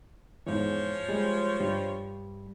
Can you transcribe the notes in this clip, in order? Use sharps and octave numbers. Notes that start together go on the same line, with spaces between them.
E2 G#2 E3 F3 C#5
G3 G#3
G2 G3